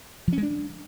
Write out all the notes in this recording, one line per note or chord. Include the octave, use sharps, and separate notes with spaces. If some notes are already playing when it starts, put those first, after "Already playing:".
F3
C#4
G#3
D4